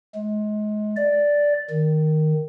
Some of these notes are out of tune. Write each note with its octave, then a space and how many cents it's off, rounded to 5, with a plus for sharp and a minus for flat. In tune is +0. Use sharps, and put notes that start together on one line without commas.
G#3 +30
D5 -5
D#3 -5